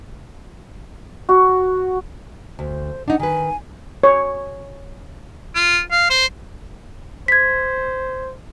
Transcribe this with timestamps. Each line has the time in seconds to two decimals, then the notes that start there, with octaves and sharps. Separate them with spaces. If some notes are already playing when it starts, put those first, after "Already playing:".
1.29 F#4
2.59 D2 C5
3.08 D4 D#4 F#5
3.20 D#3 B4 G#5
4.03 C#5
5.55 F4
5.91 F5
6.10 C5
7.28 C5 G#6 B6